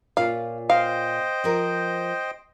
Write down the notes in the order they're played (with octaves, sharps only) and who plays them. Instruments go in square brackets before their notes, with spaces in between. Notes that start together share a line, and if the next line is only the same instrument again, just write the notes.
[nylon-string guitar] A#2 C#4 F4 [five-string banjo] F5
[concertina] C5 D#5 G5 [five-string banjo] F5
[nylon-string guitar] F3 A#4